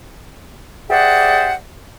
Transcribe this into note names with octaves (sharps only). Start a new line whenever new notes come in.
G4 G#4 C5 D5 E5 F#5